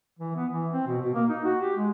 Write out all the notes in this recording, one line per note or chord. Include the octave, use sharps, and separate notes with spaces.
E3
B3
E3
C4
B2
B2
A#3
D#4
F#4
G4
G#3